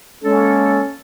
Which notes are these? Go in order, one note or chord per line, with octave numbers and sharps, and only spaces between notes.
G#3 A#3 C#4 A4